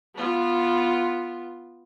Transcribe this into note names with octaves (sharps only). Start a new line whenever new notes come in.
B3 F4